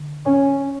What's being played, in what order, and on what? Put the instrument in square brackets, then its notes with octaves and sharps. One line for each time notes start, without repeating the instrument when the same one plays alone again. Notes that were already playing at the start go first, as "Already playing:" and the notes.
Already playing: [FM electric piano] D3
[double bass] C#4